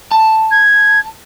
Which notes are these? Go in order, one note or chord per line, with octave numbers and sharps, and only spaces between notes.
A5
G#6